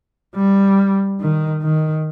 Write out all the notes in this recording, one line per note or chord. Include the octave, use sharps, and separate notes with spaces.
G3
D#3
D#3